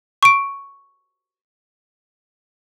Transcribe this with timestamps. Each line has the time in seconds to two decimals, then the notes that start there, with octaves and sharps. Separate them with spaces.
0.23 C#6 D7